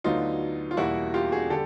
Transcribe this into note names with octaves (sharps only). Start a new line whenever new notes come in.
D2 D3 F#3 B3 D#4 F4
F4
E2 B2 G3 A#3 E4 F#4
F4 G4
F#4 G#4
D3 G3 G4 A4